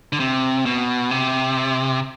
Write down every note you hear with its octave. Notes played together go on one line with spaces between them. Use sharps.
D3
C3
B2
C3